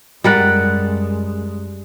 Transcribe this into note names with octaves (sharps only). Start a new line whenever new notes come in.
F#2 G3 G#3 A#4 F#5 F#6 A6